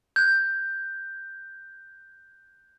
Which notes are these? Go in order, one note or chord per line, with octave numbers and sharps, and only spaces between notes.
F#6 G6